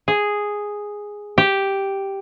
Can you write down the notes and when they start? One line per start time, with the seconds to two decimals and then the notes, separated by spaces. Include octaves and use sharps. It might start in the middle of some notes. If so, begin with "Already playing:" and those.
0.08 G#4
1.38 G4